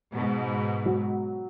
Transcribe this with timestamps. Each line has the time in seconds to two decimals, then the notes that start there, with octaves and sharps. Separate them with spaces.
0.13 G#2 B2
0.86 F#3